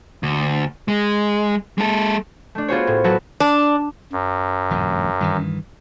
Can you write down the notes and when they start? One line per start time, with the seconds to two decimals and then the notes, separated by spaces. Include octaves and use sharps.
0.23 D2
0.88 G#3
1.78 G#3 A4
2.55 A3 D4
2.68 B3 F4 F#4 G#4 C5 C#5
2.87 A2
3.04 F#3 F#4 A4 B4
3.40 D4
4.12 F#2
4.70 D#1 A#1 G2
5.21 G2 D#3 E3